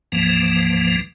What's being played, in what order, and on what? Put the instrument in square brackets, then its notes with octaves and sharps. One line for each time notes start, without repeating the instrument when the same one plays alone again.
[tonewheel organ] D2 G#2 E3 F3 A#3